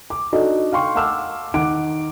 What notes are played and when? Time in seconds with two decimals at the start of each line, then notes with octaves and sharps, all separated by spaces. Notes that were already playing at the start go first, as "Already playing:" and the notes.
0.10 D6
0.32 D4 D#4 F#4 A4 D5 D#5
0.72 F5 G5 C6 C#6
0.95 F5 F#5 A5 D6 E6 F6
1.54 D#3 F#5 D6 D7